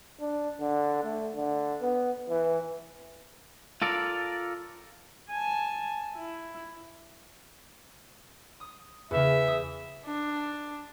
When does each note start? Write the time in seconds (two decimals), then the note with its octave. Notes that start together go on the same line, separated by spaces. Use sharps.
0.21 D4
0.61 D3
1.04 A3
1.35 D3
1.81 B3
2.29 E3
3.82 F4 A4 A#4 D5
5.30 G#5 A5
6.15 E4
8.60 D#6
9.11 E2 C#3 E5
9.48 D#6
10.05 D4